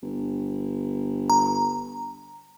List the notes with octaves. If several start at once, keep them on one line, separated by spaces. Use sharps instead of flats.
G1
A#5